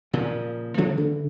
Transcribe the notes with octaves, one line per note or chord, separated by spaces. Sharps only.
A#2 C#3 F3
C#3 F3 A3 A#3
C#3 E3